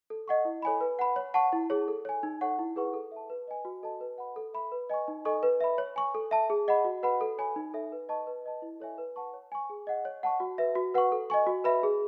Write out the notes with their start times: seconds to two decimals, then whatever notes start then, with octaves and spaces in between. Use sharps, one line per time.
0.10 A4
0.28 D#5 F#5 C#6
0.45 E4
0.62 A4 C#5 G#5 B5
0.81 B4
0.99 F#5 B5
1.16 C#5
1.34 F#5 A5 C#6
1.52 E4
1.70 G#4 C#5
1.88 A4
2.05 C#5 G#5
2.23 D#4
2.41 A4 C#5 F#5 C#6
2.59 E4
2.76 G#4 B4 F#5 C#6
2.93 A4
3.12 E5 A5
3.30 B4
3.48 D#5 G#5
3.65 F#4
3.83 A4 D#5 A5
4.01 B4
4.18 F#5 B5
4.36 A4
4.54 E5 B5
4.72 B4
4.90 D#5 G#5 C#6
5.08 D#4
5.25 A4 D#5 G#5 C#6
5.43 B4
5.61 E5 B5
5.78 C#5
5.96 G#5 C#6
6.15 A4
6.31 E5 A5
6.50 G#4
6.68 D#5 F#5 B5
6.85 F#4
7.03 B4 F#5 B5
7.21 A4
7.38 C#5 G#5 B5
7.56 D#4
7.74 A4 C#5 E5
7.92 B4
8.09 D#5 A5 C#6
8.27 B4
8.46 D#5 A5
8.62 E4
8.80 A4 C#5 E5 G#5
8.98 B4
9.16 F#5 A5 C#6
9.33 C#5
9.52 G#5 C#6
9.70 G#4
9.87 D#5 F#5
10.05 C#5
10.23 F#5 A5 C#6
10.40 F#4
10.58 B4 E5
10.75 F#4
10.94 B4 F#5 C#6
11.12 A4
11.30 D#5 G#5 C#6
11.47 F#4
11.64 B4 E5 B5
11.83 G#4